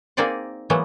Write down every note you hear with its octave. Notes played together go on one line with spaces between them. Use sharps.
A#3 C4 D#4 G#4 D5 F#5
E3 F#3 G#3 A#3 B3